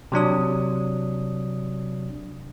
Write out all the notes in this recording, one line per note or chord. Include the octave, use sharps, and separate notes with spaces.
C3 F#3 D4 D#6